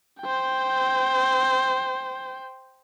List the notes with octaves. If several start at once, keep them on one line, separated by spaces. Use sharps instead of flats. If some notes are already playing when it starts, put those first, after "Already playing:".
C5 G5